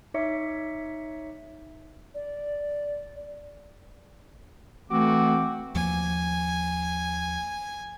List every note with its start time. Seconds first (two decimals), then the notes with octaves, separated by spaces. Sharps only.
0.14 D#4 C#5 E5 D6 B6 C#7
2.15 D5
4.91 E3 A3 C4 F#4 D6
5.75 D#2 F3 A#3 G#5